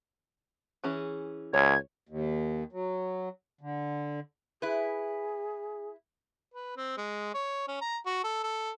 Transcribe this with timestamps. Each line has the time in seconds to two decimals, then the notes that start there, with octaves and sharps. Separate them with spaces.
0.84 E3 C#4 G#4
1.54 C#2 C#5 G#6
2.09 D#2
2.72 F#3
3.61 D3
4.62 E4 G#4 B4
6.54 B4
6.77 C4
6.97 G#3
7.35 C#5
7.68 C#4
7.81 A#5
8.06 F#4
8.24 A4
8.43 A4